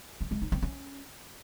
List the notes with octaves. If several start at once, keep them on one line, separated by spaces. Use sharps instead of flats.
G#3
G#3
D#4
C4
C#4